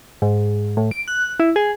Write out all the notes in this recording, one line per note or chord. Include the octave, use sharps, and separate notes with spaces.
G#2
A2
D7
F#6
E4
G#4